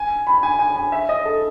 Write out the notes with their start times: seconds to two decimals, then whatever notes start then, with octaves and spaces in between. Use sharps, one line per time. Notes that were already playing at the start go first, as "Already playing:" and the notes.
Already playing: G#5
0.27 B5
0.43 G#5
0.59 G#5
0.76 G#5
0.92 E5
1.09 D#5
1.25 A4